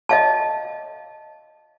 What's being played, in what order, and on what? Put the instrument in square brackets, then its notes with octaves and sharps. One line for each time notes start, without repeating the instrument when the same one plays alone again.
[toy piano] D#5 F5 A5